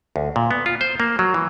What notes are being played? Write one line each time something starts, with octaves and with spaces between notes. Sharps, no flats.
D2
A#2
B3
F4
C5
A#3
F#3
E3